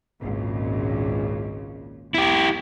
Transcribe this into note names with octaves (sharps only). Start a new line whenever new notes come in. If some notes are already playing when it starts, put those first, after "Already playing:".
G#1 C#2 A#2
E2 E4 G4